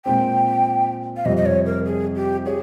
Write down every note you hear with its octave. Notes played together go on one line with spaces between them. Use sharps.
A#2 G#3 C4 G5
F5
F2 C3 G3 C4 D#5
D#5
C#5
A#4
G#4
G4
G4 G#4 C#5